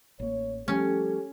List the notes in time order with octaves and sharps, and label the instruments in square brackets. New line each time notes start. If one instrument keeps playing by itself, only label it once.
[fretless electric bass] A1 A#3 [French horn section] C#5
[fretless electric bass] F3 G3 A3 [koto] C#4 [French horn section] G4 A4